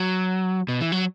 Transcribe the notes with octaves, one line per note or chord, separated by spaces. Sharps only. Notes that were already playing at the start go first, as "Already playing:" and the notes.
Already playing: F#3
B2
E3
F#3